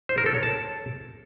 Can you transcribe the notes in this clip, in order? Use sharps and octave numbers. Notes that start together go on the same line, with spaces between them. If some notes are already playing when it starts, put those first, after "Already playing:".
C5
A#4
A4
C#5
A5